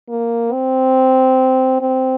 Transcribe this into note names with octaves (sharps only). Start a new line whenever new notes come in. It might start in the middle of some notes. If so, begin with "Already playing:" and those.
A#3
C4
C4